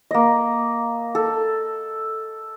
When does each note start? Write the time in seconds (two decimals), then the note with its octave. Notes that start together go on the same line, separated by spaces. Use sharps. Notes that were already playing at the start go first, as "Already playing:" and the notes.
0.11 A#3 D#5
1.15 A4